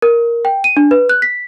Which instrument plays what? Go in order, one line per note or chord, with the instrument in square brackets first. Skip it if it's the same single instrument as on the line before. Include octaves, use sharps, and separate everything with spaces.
[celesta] A#4
G5
D#7
D4
B4
F#6
B6